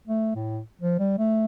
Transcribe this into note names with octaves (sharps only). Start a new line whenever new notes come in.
A3
A2
F3
G3
A3